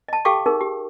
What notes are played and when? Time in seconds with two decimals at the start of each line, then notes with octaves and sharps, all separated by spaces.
0.08 D#5 A5
0.25 G4 A4 F5 G5 C#6 D6
0.46 D#4 G#4 A#4
0.61 G4